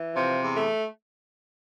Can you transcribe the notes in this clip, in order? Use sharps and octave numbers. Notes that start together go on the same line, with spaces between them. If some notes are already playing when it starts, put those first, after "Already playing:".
Already playing: E3
C3 F3
E2
A3